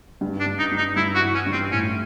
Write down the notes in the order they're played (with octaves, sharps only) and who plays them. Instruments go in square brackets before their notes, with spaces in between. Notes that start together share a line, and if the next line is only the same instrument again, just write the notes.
[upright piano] G2
[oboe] D4
[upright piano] G2
[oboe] D#4
[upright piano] G2
[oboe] D#4
[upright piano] G2 [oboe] E4
[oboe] F#4
[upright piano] E3
[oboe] C#4
[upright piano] G2
[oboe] C4
[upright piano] A2 [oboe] C#4